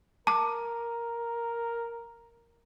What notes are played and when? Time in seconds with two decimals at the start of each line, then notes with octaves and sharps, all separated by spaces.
0.27 A#4 A5 D6